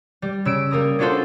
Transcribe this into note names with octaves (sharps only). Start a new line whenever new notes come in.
G3
C#3 E6 D7
G3 A#3 A#4 D#6
C#4 D4 F4 F#4 A4 C5